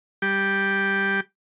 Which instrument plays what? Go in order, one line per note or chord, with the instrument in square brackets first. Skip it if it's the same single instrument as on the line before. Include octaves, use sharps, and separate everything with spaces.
[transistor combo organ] G3 G4